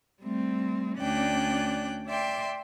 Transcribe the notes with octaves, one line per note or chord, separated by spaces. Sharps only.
G3 A3 C4
D2 C#4 D4 D5 G5 F#6
D5 E5 G5 C6